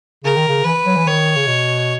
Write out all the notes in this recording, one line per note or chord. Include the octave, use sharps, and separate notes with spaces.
C#3 A#4
D#3
C#3
E3 B4
F#3
E3
D#3 C#5
C#3
B2